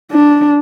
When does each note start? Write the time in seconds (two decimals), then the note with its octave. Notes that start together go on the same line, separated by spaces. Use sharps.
0.12 D4